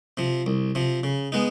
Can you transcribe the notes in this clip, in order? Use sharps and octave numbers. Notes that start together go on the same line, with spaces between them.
C3 F3
C2
C3 F3
C#3
G#3 B3 D#4